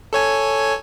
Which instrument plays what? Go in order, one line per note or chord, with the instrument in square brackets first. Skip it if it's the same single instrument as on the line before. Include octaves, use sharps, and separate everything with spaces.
[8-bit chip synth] A4 C#5 G#5